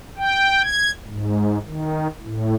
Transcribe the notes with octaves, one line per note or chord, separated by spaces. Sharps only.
G5
G#6
G#2
D#3
A2